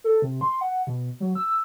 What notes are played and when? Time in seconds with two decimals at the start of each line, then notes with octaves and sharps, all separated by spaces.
0.04 A4
0.22 C3
0.41 C6
0.61 F#5
0.87 B2
1.20 F#3
1.35 E6